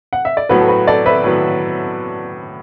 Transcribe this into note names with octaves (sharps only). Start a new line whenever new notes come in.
F#5
E5
D5
A2 F#3 B3 F#4 B4
A4
F#4 B4
A4 D5
B4 E5
A2 F#3 B3